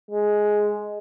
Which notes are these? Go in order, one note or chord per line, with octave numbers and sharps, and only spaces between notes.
G#3